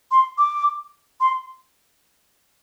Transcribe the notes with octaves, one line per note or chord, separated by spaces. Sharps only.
C6
D6
C6